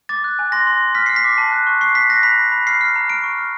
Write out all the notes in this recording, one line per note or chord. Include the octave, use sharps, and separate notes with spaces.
D6 A6
F#6
G#5
C6 A#6
C6
C6
F6 B6
F6 C7
B6
D6
A5
F#6
C#6
C#6 C7
C#6 B6
F#6 A#6
B5 B6
B5
B5
F6 C7
F6
A#5
F6 D7
C#6
F6